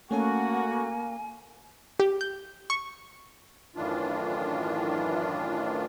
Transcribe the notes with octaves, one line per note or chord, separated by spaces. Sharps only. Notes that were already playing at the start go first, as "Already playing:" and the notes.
A3 A#3 C#4 F#4 A4 G#5
G4
G6
C#6
F#2 A2 D#3 E3 D4 F4